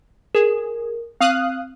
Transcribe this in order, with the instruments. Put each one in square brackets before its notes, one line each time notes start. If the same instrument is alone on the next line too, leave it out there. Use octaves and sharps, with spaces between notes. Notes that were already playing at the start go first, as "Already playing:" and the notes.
[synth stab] G#4 [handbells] A#4
[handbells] C4 [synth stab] F5 D#6 F#6